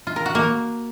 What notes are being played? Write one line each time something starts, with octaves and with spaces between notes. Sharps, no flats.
F4
A#4
F#4
A#3